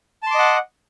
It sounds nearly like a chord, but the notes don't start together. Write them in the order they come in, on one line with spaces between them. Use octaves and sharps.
A5 C6 D6 D#5 F#5